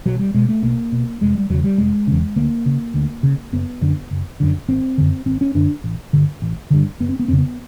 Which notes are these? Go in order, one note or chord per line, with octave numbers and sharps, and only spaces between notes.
B1 F#3
G3
B2 G#3
A3
B1 A#3
B2
F1 G#3
G3
E2 C#3 F#3
G3
F1 G#3
E2 C#3
D2 A#3
C#3
D2
C#3
F#1 B3
F#2 D3
F#1
F#2 D3
G#1 C4
F#2 D3
G#1 C4
C#4
F#2 D3 D4
A1
G2 D3
A1
G2 D3
F#1 B3
C4
B3
F2 C#3 C4
B3